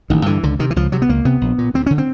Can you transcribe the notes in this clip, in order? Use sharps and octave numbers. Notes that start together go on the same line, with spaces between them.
A1 D#3
G2 D3 E3
C#2 D3
C3 D#3
E3
C#2 F3
C3 F#3
B3
C#2 A#3
C3 B3
A#1
A#2
D2 C4
D3 C#4
C4